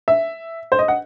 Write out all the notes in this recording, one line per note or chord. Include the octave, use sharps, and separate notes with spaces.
E5
C5
D#5
F#5